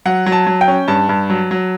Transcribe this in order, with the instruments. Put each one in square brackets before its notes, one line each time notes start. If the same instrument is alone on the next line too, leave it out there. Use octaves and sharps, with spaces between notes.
[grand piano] F#3 F#5
F#3
A5
F#3
G5
C#4
G2 A5
G2
F#3
F#3